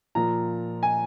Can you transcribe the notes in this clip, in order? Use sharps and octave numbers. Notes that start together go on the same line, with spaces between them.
A#2 F3 A#5
G#5